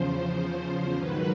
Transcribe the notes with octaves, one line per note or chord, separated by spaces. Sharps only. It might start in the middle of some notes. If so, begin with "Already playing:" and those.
Already playing: E2 C#3 F3 C5
G#2 D#3 F#3 B4